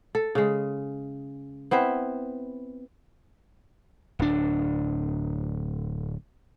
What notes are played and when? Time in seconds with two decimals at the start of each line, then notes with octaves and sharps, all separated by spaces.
0.15 A4
0.35 C#3 G#3
1.71 B3 C4 E4 B4
4.19 D1 D4